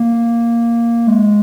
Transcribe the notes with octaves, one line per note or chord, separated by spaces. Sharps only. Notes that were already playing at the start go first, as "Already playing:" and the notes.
Already playing: A#3
G#3